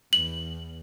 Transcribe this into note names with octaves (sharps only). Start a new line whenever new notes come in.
E2 F#7